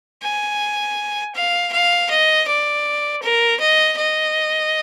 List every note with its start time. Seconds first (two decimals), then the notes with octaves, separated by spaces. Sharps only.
0.23 G#5
1.35 F5
1.72 F5
2.10 D#5
2.47 D5
3.23 A#4
3.60 D#5
3.97 D#5